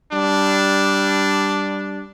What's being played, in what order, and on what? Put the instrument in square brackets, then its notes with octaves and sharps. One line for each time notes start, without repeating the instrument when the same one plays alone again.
[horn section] G3 D4